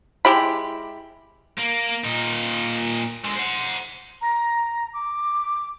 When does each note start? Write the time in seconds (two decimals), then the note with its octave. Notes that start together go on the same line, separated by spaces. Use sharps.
0.25 G#3 E4 G4 B5
1.58 A#3
2.04 A#2 D#4
3.25 D3 G#3
3.36 C5 F#5
4.22 A#5
4.94 D6